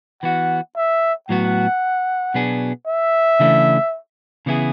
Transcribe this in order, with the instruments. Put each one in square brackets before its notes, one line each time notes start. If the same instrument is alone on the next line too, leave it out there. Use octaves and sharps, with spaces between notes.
[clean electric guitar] E3 B3 F#4 [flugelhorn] F#5
[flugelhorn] E5
[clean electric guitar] A2 F#3 B3 F#4 [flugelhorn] F#5
[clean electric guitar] B2 F#3 B3 D4 G#4
[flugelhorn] E5
[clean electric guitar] C#3 E3 A3 D4
C#3 E3 B3 E4 G#4